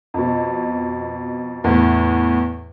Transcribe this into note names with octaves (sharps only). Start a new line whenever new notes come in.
F2 B2
E2 A2